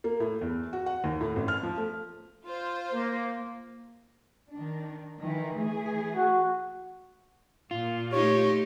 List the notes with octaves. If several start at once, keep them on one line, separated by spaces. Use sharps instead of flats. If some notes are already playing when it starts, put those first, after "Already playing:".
A#3
A2
E2
F#4
F#5
D#2
A2
A1
F6
F3
A3
F4 C5
A#3
D#3 D4
D#3 E3
E3 A3 G#4
F#4
A#2 F4
A3 D#4 G4 C#5